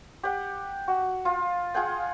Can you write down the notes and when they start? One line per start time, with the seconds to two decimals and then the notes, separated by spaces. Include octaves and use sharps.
0.23 G4 F#5
0.88 F#4
1.25 F4
1.74 F4 G#4 F#5 G5